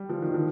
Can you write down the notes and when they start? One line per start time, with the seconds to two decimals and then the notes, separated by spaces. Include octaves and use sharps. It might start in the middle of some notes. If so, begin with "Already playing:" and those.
Already playing: G3
0.09 F3
0.22 D#3
0.34 F3